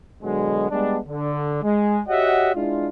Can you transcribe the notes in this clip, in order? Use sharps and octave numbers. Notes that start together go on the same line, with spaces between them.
B2 D3 F#3 G#3
G3 G#3 B3 D4
D3
G#3
F#4 G4 C#5 D#5 E5 F#5
G#3 D4 E4 F4